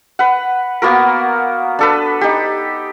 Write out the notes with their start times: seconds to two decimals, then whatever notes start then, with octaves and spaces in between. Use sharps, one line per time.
0.19 B4 F#5
0.82 A#3 B3 F#4 A#4
1.79 D4 A4 B4
2.21 D#4 G4